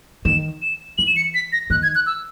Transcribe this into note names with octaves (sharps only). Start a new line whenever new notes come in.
D#3 E7
E7
E3 F#7
E7
C#7
B6
A#6
D#3 F#6
G#6
F#6
E6